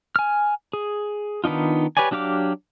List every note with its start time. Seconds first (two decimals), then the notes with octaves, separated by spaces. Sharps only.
0.16 G#5 F6
0.73 G#4
1.44 D#3 B3 D4 D#4 F4
1.97 G4 B4 C#5 D5 G#5
2.11 F#3 D4 G4 F5 D6